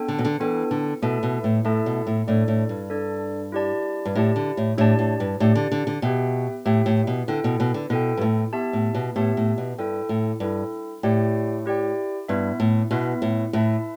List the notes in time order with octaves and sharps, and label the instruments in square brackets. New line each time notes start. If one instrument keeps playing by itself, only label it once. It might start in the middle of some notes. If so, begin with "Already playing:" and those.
Already playing: [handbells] B3 D4 A4 G5
[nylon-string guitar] D3
B2
D3
[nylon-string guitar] E3 [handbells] B3 D4 A4 G5
[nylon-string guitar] D3
[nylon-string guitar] B2 [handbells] A3 E4 A4 E5 A5
[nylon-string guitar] B2
A2
[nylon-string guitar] A2 [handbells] A3 E4 A4 E5 A5
[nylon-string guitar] B2
A2
[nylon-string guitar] A2 [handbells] D4 A4 D5
[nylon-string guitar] A2
G2
[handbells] D4 A4 D5
E4 G4 D5 A5
[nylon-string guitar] G2
[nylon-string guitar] A2 [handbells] E4 G4 D5 A5
[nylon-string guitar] D3
A2
[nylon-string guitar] A2 [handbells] D4 G4 D5 A5
[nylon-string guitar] A2
G2
[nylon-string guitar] A2 [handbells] D4 G4 D5 A5
[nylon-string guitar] D3
D3
D3
[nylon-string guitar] B2 [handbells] G4 B4 E5 G5
[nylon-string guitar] A2 [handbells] G4 B4 E5 G5
[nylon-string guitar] A2
B2
[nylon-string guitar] D3 [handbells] E4 A4 G5
[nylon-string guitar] B2
B2
D3
[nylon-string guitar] B2 [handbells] E4 A4 G5
[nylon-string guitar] G2
A2
[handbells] B3 G4 E5 A5
[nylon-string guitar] A2
B2
[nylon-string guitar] A2 [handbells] B3 G4 E5 A5
[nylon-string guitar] A2
B2
[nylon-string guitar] G2 [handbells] E4 A4 G5
[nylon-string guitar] A2
[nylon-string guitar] G2 [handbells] E4 A4 G5
[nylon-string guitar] A2 [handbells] E4 G4 D5 G5
[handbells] E4 G4 D5 G5
[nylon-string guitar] G2 [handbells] B3 E4 B4 E5
[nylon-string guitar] A2
[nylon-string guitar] B2 [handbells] B3 E4 B4 E5
[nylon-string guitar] A2
[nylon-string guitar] A2 [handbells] E4 B4 E5 A5